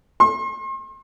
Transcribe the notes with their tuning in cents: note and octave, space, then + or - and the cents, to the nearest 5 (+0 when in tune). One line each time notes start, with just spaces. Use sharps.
C6 +40